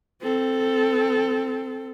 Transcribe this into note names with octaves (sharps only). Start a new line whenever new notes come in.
C4 A4